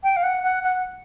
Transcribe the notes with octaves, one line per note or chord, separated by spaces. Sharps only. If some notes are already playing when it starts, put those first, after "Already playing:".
G5
F5
F#5
F#5
F#5